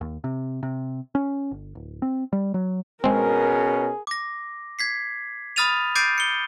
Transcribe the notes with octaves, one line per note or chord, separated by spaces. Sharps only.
D#2
C3
C3
C#4
G1
D1
C4
G3
F#3
B2 G#3 C4 C#4 G#4 A#4
D6 A#6
G#6 B6 C7
B5 D#6 F6 A6 D#7 F7
D6 G6 A6 C7 D7 D#7
C#7 G7